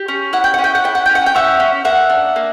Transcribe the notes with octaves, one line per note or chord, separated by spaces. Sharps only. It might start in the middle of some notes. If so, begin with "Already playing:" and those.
Already playing: G4
C#4
E4 F#5
G5
F#5
C#4
G5
F#5
E4 G5
F#5
C#4 G5
F#5
G5
C#4 E5 F#5
C#4
A#3 E5 F#5
D4
A#3